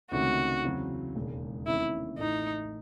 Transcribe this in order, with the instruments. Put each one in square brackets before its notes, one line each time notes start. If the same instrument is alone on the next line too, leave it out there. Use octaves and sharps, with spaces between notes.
[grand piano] C#2 C3 D#3 A3 C#4 [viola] F#4
[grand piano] E2 C#3 F#3 C4
E1 D#2 C#3 G#3
[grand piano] E2 C3 D#3 A3 C#4 [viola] E4
[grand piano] A1 A2 E3 A3 [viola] D#4